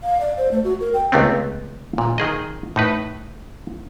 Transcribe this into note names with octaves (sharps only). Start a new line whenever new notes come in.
F5
D5
C5
A3
F#4
A#4
G5
C#2 C3 A3 B3 C4
A#2
D#3 G#4 D#5
A2 D#4 B4